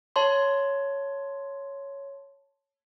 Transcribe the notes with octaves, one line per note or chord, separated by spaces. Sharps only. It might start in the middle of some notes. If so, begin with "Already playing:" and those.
C#5 A5 C6